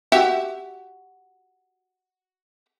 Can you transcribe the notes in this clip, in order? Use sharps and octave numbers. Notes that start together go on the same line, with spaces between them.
F#4 G4 E5